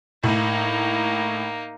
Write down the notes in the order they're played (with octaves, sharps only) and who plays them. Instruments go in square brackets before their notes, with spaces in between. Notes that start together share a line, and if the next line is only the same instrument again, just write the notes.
[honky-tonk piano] A2 [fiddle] A#3 D#4